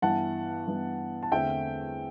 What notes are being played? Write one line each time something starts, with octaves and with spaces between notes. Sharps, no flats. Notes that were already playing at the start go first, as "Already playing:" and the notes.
G2 E3 B3 F#5 A5
G2 E3 B3
A5
E2 D3 A3 C4 E5 G5